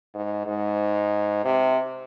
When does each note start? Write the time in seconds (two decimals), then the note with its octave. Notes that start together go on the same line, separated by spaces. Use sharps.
0.14 G#2
0.47 G#2
1.45 C3